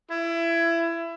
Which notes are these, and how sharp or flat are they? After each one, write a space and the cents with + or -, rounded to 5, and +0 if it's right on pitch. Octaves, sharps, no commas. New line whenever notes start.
E4 +25